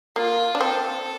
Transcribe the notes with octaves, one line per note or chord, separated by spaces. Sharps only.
A#3 F4
D4
C4 A4